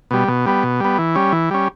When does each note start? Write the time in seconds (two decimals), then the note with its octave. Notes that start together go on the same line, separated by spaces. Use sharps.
0.11 B2 G3
0.28 B2
0.46 G3 B3
0.63 B2
0.80 G3 B3
0.98 E3
1.15 G3 C#4
1.32 E3
1.51 G3 C#4